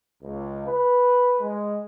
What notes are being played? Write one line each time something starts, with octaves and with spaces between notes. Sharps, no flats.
C#2
B4
G#3